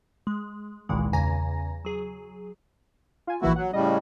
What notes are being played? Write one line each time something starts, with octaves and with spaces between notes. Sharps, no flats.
G#3
G#1 C#2 A#2 D#3 E3 G#3
E2 C#3 G#5 A#5 A#6
F#3 G#4
F4 G#5
A#1 E3 A#3 E4 F#4
F#3 F#5
A2 C#3 G3 D#5